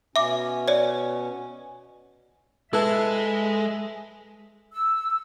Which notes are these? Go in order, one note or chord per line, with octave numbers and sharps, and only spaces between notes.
B2 C#4 E5 D6
C#5 D5
G#3 E4 A4 B4 E5 A5
E6